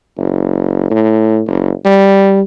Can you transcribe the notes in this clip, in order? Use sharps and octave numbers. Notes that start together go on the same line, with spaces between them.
F#1
A2
F#1
G3